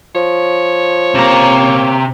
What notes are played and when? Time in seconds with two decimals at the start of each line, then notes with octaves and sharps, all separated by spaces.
0.15 F3 C#5
1.14 C3 A#3 A#5